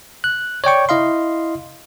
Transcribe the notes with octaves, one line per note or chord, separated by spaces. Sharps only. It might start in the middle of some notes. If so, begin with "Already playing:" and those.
F#6
C#5 D5 G5 C#6
E4 D#5 F5 C6